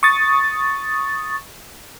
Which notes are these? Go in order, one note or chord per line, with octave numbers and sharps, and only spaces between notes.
C#6 D#6 A6